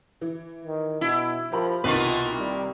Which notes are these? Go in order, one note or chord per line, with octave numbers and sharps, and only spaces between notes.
E3
D#3
B2 E4
F3 G4 A#4 B5
C2 B2 D#3 A#3 F4 B4 C#6
G3